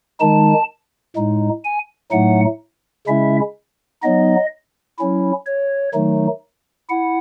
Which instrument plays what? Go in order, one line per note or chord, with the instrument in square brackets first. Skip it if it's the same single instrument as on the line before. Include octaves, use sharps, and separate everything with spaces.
[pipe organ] D#3 G#3 D#4 A5
A2 G#3 D#4
G#5
A2 F#3 A3 D#4 F#5
C#3 G#3 C#4 E4 E5
F#3 B3 D#4 D#5
F#3 C#4 E4
C#5
D#3 F#3 A3 D#4
E4 F#5